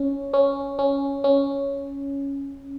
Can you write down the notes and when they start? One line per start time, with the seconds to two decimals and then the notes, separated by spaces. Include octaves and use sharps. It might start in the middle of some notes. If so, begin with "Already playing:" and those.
Already playing: C#4
0.33 C#4
0.79 C#4
1.24 C#4